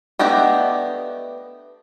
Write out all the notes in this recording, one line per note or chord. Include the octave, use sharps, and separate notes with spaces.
A3 B3 D4 G4 D#5